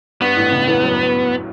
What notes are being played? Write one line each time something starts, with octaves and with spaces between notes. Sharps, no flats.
G2 B3
A1 A2
C#2 C#3
E2 E3
F#2 F#3